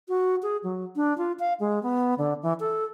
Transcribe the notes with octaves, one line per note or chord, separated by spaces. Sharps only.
F#4
G#4
F#3
D4
F4
F5
G#3
B3
D3
E3
A4